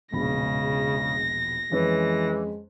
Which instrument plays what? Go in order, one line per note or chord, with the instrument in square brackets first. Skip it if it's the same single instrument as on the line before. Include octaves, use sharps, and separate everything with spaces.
[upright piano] E1 A#1 B5 [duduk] C#3 [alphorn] G#3 [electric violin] A#6
[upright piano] F2 C#4 B4 [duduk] E3 [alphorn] G#3